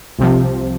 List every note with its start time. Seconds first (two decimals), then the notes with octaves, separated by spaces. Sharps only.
0.19 C2 C3 F3